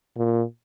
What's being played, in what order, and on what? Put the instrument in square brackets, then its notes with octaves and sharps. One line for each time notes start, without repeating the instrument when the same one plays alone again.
[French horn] A#2